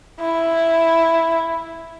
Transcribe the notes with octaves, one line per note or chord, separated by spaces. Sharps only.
E4